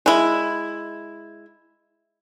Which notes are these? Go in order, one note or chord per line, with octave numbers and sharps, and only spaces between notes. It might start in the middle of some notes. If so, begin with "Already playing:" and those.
G#3 E4